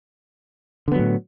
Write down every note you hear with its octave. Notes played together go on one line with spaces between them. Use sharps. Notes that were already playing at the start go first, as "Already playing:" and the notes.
A2 D3 F#3 B3